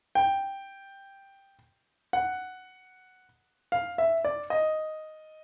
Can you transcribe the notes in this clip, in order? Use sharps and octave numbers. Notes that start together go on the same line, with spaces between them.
G5
F#5
F5
E5
D5
D#5